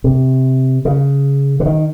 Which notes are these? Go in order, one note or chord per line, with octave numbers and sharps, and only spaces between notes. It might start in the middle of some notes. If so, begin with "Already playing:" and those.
C3
C#3
D3
D#3